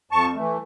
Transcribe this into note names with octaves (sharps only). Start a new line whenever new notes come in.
F2 A5 C#6
E3 A3